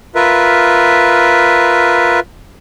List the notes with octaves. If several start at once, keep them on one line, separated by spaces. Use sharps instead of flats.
F4 A#4 B4 E5